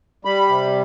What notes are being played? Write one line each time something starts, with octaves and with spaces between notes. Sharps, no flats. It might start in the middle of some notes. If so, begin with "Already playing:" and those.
G3 B5
C3